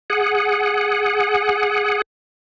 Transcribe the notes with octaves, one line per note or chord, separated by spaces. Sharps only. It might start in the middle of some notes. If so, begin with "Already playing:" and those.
G#4 F#5